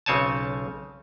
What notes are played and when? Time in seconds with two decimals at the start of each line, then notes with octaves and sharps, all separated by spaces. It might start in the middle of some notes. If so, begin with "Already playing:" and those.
0.06 B1 C#3 C4 C#5 G#5 A5